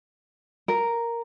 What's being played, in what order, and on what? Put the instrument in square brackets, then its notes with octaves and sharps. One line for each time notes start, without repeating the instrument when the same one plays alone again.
[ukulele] A#4